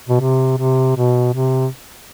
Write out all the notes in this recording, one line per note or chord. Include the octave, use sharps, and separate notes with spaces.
B2
C3
C3
B2
C3